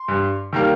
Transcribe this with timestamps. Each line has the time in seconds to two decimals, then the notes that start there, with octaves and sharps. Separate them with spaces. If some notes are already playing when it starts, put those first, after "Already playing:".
Already playing: C6
0.08 G2
0.53 D#3 G3 A#3